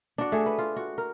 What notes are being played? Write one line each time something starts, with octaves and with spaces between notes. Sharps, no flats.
D4 F#4
A3 G#4
B4
F4
F#4
A#4